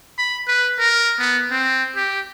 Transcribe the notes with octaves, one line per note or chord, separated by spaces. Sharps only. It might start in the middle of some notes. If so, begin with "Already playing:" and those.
B5
B4
A#4
B3
C4
G4